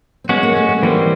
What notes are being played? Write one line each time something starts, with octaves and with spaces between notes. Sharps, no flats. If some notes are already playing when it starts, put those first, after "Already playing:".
C4
G#3 B3 C#4 F#4
A#3
A3
A3
E3 G3 A#3 C4